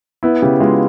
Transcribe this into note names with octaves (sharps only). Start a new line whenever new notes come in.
B3 E4
C#3 G4
G#3 F4